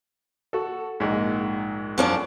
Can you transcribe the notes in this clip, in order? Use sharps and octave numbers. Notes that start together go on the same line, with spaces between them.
F#4 A4
A#1 G#2
F#2 F3 D4